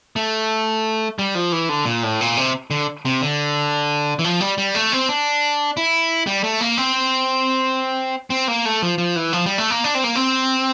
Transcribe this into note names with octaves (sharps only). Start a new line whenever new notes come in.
A3
G3
F3
E3
D3
A#2
A2
A#2
C3
D3
C3
D3
E3
F3
G3
G3
A3
C4
D4
E4
G3
A3
A#3
C4
C4
A#3
A3
F3
F3
E3
F3
G3
A3
A#3
D4
C4
A#3
C4